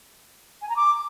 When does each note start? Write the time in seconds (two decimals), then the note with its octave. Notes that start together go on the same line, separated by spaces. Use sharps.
0.62 G#5
0.69 A#5
0.77 D6